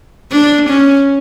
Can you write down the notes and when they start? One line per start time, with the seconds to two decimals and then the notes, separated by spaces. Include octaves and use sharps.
0.32 D4
0.70 C#4